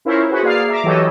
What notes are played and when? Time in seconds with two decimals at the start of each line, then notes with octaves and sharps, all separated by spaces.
0.05 C#4 E4 F4 A#4 C5 C#5
0.30 F#4 G#4 B4 C5
0.43 A#3 G#4 D5 F5 C7
0.69 E5 A#5 D6
0.84 E3 F#3 G4 A4 C#5 D#5